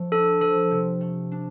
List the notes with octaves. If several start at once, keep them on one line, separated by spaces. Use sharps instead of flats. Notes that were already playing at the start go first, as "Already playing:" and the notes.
Already playing: F3 A3
D4 A4
F3 A4
C3
A3
D4